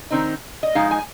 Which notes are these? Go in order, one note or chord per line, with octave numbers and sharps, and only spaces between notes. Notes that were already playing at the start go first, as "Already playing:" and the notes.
D#3 C4 D#4
D#5
F3 G#3 D#4 F5
G#5